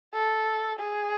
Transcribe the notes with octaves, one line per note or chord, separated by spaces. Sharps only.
A4
G#4